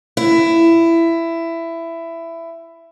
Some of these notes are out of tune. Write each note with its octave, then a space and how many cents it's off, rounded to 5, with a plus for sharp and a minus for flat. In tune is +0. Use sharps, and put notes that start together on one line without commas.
E4 +15